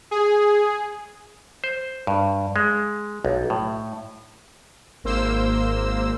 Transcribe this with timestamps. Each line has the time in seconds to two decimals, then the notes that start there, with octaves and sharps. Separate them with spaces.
0.11 G#4
1.64 C5
2.07 G2
2.56 G#3
3.25 B1
3.50 A2
5.04 G#1 A#3 C5 E6